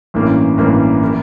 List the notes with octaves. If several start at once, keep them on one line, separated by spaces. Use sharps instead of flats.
A1 G2 E3 A#3 C#4
A1 G2 E3 A#3 C#4
E3 A#3 E4